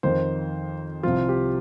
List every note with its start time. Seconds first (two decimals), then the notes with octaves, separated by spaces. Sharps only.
0.03 F2 D#3 C5
1.03 C2 C3 F3 F4
1.29 G4